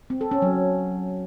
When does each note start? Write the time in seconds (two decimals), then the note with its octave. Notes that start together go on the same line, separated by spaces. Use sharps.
0.10 C4
0.21 A4
0.31 C#4
0.42 F#3